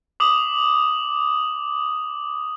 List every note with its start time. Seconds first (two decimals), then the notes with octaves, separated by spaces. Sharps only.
0.20 D6 D#6 F#7